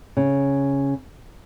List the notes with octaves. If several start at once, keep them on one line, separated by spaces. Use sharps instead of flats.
C#3